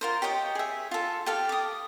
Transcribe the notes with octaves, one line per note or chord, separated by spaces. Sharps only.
F4 A#4 C5
G4 C#5 D#5 G5
G#4 E5
F4 A4
G4 A4 F5
D6 D#6